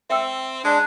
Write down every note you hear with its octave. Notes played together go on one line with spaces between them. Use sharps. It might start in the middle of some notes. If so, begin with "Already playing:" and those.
C4 E5 G5 E6
G#3 D4